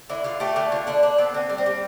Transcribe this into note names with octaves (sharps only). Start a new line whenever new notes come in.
D3 E4
D3 F4
A3 G4
D3 G4
D3 F4
D3 D4
D3 D4
B3 C4
D3 C4
G3
C4
G3